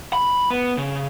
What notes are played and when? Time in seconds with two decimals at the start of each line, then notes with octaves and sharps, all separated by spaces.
0.13 B5
0.51 B3
0.78 C#3